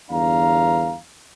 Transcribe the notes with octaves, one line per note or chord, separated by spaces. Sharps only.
G1 E2 D4 F5 A#5